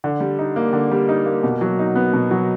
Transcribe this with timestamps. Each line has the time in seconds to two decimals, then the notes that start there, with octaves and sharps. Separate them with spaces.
0.04 D3
0.20 G3
0.39 D#4
0.56 A#3
0.73 D3
0.91 G3
1.09 D#4
1.26 A#3
1.43 B2
1.61 F#3
1.79 D#4
1.96 B3
2.13 B2
2.31 F#3